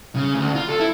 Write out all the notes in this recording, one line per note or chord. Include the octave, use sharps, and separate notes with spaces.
C#3
D2
F4
A4
E4